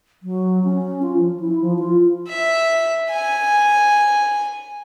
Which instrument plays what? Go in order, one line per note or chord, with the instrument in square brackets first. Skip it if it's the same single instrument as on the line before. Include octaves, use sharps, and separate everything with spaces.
[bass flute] F#3
C#4
F4
F3
E4
F3
F4
[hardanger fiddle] E5
G#5